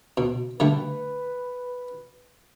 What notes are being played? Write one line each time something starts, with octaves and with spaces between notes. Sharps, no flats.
B2
D3 G3 A3 B4